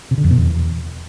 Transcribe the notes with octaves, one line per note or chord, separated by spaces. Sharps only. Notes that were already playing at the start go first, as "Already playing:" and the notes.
C3
D3
F2
B2
E2